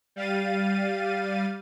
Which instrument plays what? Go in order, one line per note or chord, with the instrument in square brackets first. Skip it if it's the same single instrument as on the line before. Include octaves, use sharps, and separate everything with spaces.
[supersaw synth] G3 F5 A6 D#7